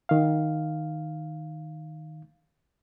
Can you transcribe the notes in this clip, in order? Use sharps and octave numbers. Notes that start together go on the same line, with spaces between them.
D#3 F5